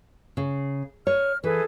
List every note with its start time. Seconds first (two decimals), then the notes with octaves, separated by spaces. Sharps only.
0.37 C#3
1.07 C#5 F6
1.44 E3 G#4 A4 B4